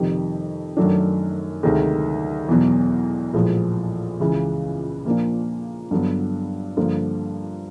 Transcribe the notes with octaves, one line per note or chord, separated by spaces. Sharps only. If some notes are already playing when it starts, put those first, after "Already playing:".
Already playing: F2 C3 D#3 G3
F#2 D#3 F#3 A3 D4
D2 C3 D#3 G#3
E2 B2 F#3
A#1 A2 F3 G#3
C#2 C#3 E3
A#2 F3 A#3 D4
G2 D3 F#3 B3
G2 D3 F3 A#3